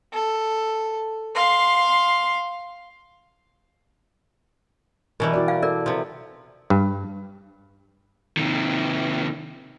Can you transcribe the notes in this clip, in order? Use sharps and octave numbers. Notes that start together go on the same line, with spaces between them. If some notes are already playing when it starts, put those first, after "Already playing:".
A4
F5 C6
B2 E3 G3 A#4
E4 F#4 D5
F5
A4 A#4 D5
C3 F3
G2
C3 D#3